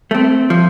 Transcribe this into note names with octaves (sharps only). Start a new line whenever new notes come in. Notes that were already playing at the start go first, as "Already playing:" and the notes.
A3 C4
F3